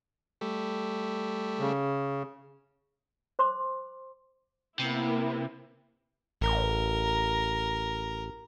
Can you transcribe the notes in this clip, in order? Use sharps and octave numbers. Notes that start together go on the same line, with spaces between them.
G3 A3
C#3
C5 C6 D6
C3 A#3 B3 E4
A1 A#4